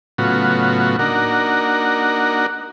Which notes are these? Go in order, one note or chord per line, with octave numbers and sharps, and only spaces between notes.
A2 C#3 F#3 B3 F4 F#4
A#3 D4 D#4 F#4 A#4 F#5